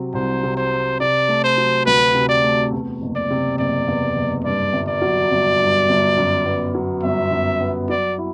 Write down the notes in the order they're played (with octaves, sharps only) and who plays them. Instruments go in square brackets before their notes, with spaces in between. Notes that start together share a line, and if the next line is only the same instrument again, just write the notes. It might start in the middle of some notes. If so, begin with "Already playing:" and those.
Already playing: [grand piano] C3 F#3 C4
[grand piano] C2 [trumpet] C5
[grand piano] C3
[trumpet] C5
[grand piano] C4
[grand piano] C3 [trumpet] D5
[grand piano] A3
[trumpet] C5
[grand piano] F#3
[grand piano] D2 [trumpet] B4
[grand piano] C3
[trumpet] D5
[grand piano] A3
E2
F#1
[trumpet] D5
[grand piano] C3
[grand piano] F#1 [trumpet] D5
[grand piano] E2
F#1
[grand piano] G2 [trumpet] D5
[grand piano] G1
[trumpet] D5
[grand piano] F#3
G1
G2
G1
F#2
B3
F#3
[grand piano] G1 [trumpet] E5
[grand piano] F#2
B3
[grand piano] F#3 [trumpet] D5
[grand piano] E4